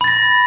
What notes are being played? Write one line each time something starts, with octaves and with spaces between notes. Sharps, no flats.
B5 A6 A#6